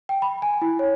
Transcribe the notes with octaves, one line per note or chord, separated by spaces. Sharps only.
G5
B5
G#5
E4
C#5